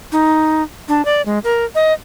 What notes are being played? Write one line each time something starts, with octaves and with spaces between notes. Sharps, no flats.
D#4
D4
D5
G#3
A#4
D#5